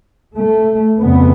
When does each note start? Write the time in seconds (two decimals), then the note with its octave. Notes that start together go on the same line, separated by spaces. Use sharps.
0.36 A3
1.00 F2 C#3 B3